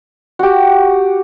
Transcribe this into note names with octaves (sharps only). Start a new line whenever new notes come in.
F#4 G4